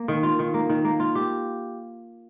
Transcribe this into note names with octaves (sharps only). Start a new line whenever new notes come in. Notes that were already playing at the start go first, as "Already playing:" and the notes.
Already playing: A#3
D#3
F4
D#3
A#3
D#3
A#3
F4
G4